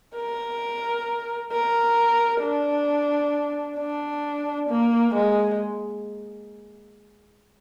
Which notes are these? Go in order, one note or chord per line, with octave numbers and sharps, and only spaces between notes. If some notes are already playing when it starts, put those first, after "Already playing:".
A#4
A#4
D4
D4
A#3
G#3